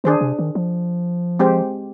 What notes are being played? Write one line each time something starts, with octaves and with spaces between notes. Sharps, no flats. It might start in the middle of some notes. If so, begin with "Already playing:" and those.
D#3 D4 G#4 C5
C3
D#3
F3
G#3 C4 G4 C5